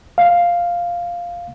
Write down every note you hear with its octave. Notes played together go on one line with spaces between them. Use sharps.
F5